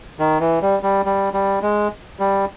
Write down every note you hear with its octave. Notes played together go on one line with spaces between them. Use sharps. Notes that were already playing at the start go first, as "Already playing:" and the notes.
D#3
E3
G3
G3
G3
G3
G#3
G3